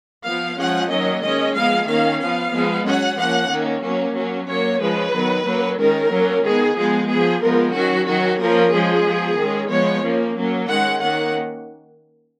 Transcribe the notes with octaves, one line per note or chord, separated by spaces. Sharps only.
F3 B3 F5
F3 G#3 C#4 F#5
D#3 F#3 A#3 C#4 D#5
D#3 G#3 C#4 D#5
F3 G#3 B3 F5
D#3 A#3 C#4 F5
F3 B3 F5
F3 G#3 B3
F#3 C#4 F#5
F3 A#3 C#4 F#5
D#3 A#3 C#4
F#3 A#3 C#4
F#3 A#3 C#4
F#3 A#3 C#4 C#5
F3 G#3 C#4 B4
D#3 F#3 B3
F#3 A#3 C#4
D#3 G#3 C#4 A#4
F#3 A#3 C#4
D#3 G#3 B3 G#4
F3 G#3 B3 G#4
F3 B3 G#4
F3 G#3 B3 A#4
D#3 F#3 C#4 F#4
D#3 F#3 C#4 F#4
F3 A#3 C#4 A#4
F3 G#3 C#4 G#4
F3 B3
D#3 G#3 C#4
F3 G#3 B3 C#5
F3 A#3 C#4
F#3 A#3 C#4
D#3 G#3 C#4 F#5
D#3 A#3 C#4 F#5